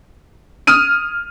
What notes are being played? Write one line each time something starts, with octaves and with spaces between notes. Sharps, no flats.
D#6 F6 D#7